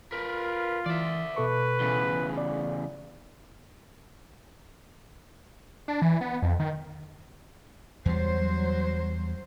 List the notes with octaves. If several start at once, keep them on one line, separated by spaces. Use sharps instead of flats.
F4 A#4 B4
E3 D5 E5
B2 A4 B4 C#6
E2 C#3
D5
D4
E3
B3
F2
D#3
E2 F#3 G3 C5